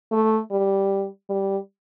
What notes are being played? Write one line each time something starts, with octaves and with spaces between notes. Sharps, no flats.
A3
G3
G3